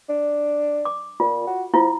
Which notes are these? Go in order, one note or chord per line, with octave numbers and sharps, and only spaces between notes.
D4
D6
A#2 F4
F#4
F3 E4 F4